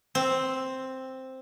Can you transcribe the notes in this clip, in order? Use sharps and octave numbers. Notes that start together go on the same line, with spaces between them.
C4